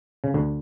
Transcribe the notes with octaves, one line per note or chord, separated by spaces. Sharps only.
C#3
D2 D3